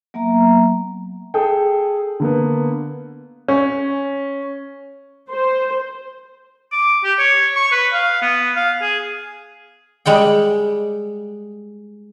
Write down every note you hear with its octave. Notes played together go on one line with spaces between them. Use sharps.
F#3 A#3 B3 E5 A#5
G#4 A4 G5
D3 A#3 B3
C#4
C5
D6
G4
C#5
C#6
B4
F5
B3
F5
G#4
G3 G#3 F#5 G5